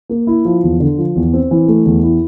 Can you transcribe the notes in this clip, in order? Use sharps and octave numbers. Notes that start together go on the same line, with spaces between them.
A#3
E4
F3
E2
D3
F3
E2
C4
E3
A3
E2
E4